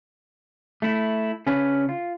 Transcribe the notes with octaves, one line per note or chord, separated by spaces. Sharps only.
A3 E4
C#3 C#4 D4 B4
F4